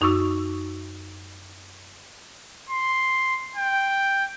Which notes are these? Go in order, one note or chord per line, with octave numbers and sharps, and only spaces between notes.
F#2 D#4 F#4 C#6 D6 E6
C6
G5